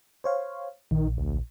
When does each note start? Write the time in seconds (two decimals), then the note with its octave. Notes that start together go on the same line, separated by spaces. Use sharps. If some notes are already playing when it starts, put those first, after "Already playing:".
0.24 C5 C#5 F5
0.91 A#1 D#3
1.17 D2